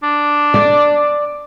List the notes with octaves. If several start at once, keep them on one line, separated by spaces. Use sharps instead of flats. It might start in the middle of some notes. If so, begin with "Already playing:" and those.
D4
D5